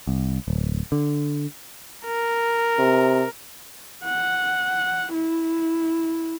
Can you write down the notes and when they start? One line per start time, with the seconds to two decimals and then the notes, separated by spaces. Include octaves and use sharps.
0.07 C2
0.48 D1
0.92 D3
2.05 A#4
2.79 C3
4.04 F#5
5.14 E4